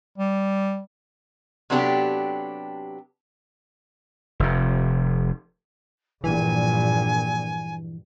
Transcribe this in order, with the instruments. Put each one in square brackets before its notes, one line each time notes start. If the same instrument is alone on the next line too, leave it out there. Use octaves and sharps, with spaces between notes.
[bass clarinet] G3
[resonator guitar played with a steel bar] C3 F#3 B3 D4 G4 A4
[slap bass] F1 C3
[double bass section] A#1 G2 A#2 [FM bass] E3 [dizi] G#5